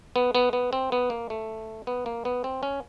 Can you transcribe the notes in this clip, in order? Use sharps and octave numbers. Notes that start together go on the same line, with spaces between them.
B3
B3
B3
C4
B3
A#3
A3
B3
A#3
B3
C4
C#4